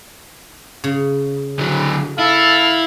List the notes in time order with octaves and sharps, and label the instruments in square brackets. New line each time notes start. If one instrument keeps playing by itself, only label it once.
[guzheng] C#3
[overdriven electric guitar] D3 F#3
[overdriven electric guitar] E4 [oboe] A4 [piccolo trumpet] F5